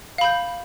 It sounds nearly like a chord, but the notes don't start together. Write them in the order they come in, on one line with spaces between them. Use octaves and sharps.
F5 B5 G6